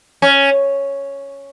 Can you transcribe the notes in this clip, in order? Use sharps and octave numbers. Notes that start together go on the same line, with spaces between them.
C#4